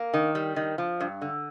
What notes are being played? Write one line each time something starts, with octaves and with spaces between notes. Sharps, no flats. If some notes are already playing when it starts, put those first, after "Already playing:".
Already playing: A#3
D#3
G3
D#3
F3
G2
D3